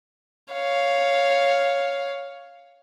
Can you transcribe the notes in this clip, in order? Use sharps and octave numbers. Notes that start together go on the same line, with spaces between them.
C#5 F5